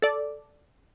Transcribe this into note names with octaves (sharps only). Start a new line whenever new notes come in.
A4 D5